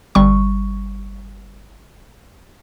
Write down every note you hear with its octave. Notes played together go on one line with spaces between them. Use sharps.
G1 G3 C#6